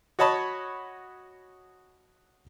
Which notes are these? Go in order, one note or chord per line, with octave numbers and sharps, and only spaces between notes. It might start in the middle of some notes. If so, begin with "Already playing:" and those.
F#4 C#5 D#5 A5 B5 C#6